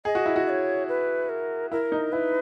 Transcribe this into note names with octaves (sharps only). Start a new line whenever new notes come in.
G#4 D#5
F#4
E4
F#4
D#5
C#5
B4
A#4
E4 A#4
D#4
E4 B4